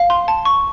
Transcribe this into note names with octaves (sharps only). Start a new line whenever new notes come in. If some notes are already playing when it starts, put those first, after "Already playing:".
Already playing: F5
C6
A5
C#6